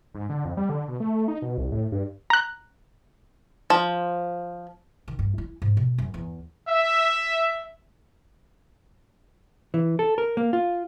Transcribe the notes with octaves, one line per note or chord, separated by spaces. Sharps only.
G#2
D3
F2
G3
D3
B2
A3
D#4
B2
C2
A2
G2
A#5 F#6
F3
D#3
G2
E4
G#2
B2
F#2
E2
E5
E3
A4
A#4
A#3
F4